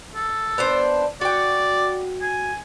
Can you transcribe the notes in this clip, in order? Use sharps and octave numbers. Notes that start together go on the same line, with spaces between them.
A4
B3 D4 C5
F#4 D5 G5
G#5